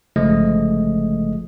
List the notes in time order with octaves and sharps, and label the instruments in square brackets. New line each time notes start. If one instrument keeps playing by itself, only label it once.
[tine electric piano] G1 C#3 F3 G#3 A3 D#5